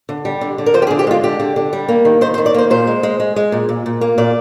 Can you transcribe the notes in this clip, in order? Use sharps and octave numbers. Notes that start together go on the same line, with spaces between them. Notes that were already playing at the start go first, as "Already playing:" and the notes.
D3
G3
D3
D3
A#4
F3 C5
G4
G#4
D3
G4
G#3 F4
D3 G4
D3
D3
G3
A#3
D#3
D#3 C5
C5
D#3
D5
A#3 C5
A#2 C5
G#3
G#3
G#3
G#3
A#2
A#2
A#2
A#3
A#2 D5